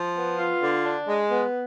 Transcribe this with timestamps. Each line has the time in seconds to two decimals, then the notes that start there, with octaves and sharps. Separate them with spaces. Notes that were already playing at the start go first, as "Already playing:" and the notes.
Already playing: F3
0.15 B3
0.38 F4
0.61 D3
0.85 D4
1.07 G#3
1.30 B3